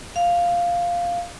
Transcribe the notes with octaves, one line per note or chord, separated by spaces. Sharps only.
F5